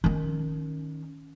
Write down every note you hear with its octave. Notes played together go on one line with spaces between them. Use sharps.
D#3 C#4